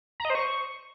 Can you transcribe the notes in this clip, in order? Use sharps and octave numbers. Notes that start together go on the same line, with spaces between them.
A#5
D#5
C5
C#6